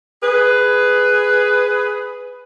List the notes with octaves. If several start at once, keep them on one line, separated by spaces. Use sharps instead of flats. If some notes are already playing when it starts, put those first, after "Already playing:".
G#4 B4